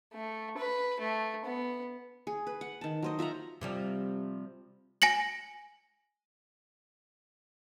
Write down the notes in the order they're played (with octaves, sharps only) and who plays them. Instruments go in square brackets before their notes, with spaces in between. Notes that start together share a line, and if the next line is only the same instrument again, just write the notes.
[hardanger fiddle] A3
B4
A3
B3
[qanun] G#4
B4
F#5
D#3 A5
F#3 C5 D#5
F4 E5 F#5 A#5
[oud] C3 F3 G3
[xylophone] G#5 A#6 C#7 F#7